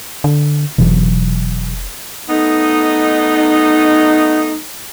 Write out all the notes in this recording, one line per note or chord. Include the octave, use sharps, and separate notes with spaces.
D3
F1 B2 E3 F#3
A3 B3 D#4